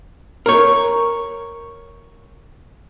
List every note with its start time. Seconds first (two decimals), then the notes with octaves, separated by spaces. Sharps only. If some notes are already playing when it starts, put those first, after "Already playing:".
0.46 A#4 C#5